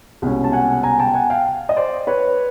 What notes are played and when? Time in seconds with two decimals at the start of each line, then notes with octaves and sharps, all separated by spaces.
0.22 C2 B2 G#3 C#4
0.44 A5
0.52 F#5 G#5
0.83 G#5 A#5
0.99 G5 A5
1.14 F#5 G#5
1.30 F5 G5
1.69 D#5
1.76 C5 D5
2.07 B4 C#5